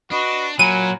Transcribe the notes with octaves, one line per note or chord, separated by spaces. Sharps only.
D4 F#4 B4 D#5
A#2 F#3 A#4 G#5 B5 D#7